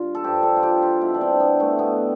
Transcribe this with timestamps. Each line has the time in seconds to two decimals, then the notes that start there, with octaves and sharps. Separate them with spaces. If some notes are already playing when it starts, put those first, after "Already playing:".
Already playing: G2 F4
0.15 A4
0.24 G2 F3 G4
0.43 A4
0.57 F4
0.63 G4
0.83 F4
1.01 B2 E4
1.14 D4
1.21 C4
1.40 B3
1.60 A3
1.79 B2 B3